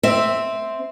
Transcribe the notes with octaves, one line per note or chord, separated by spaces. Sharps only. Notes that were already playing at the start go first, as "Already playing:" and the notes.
C4 E5